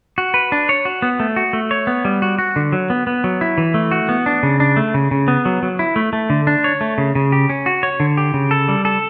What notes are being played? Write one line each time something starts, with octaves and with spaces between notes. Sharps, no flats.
F#4
B4
D4
C#5
F#4
B3
A3
F#4
A3
C#5
B3
G3
F#4
F#4
D3
F#3
B3
B3
F#3
E4
E3
A3
F#4
B3
D4
C#3
D4
A3
C#3
C#3
B3
F#3
F#3
E4
A3
A3
D3
D4
C#5
A3
C#3
C#3
G4
C#4
F#4
C#5
D3
G4
C#3
A4
G3
A4